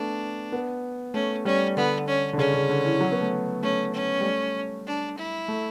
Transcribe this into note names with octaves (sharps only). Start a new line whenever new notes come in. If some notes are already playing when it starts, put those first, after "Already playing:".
Already playing: A3 B3 D4
B3
A3 C#4
G3 C#4
D3 B3
C#4
D3
C#3 C#4
C#3
D3
E3
F#3
B3
A3
A3 C#4
C#4
G3
A3
D4
E4
A3